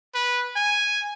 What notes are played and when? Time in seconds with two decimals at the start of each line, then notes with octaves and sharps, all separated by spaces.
0.15 B4
0.56 G#5